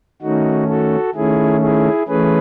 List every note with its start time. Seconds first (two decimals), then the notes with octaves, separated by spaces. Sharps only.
0.22 D#3 A3 C#4 D#4 F#4
0.68 F#4 A4
1.14 D#3 A3 C#4 E4 G#4
1.61 E4 G#4
2.08 E3 A3 C#4 G#4 B4